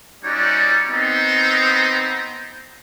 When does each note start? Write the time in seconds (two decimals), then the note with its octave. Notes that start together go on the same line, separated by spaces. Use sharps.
0.24 G3 C#4 D#4 F#4 C#5 D5
0.87 B3 C4 D#4